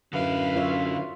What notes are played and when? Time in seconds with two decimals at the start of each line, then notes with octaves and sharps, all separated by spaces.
0.13 F#2 D3 E4 B4 F5
0.56 F4 C#5 E5